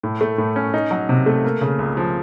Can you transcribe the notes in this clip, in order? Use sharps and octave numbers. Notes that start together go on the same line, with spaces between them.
A2
A3
A2
C#4
D#4
F#3
C3
A3
A#3
C#3
C#2
F3